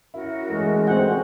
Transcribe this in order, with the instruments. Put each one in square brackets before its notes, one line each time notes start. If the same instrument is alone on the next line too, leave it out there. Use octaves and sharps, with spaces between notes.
[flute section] C#4 F#4 A#4 [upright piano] E4
[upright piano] E2 A3 [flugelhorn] G#3
[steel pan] C4 F#4 F#5 [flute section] G#5 [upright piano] G6